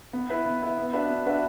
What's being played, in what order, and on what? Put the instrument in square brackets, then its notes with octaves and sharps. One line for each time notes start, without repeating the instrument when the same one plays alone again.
[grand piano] B3
E4 B4 E5
B3
E4 B4 E5
B3
D4 F#4 B4 E5
B3
D4 F#4 B4 E5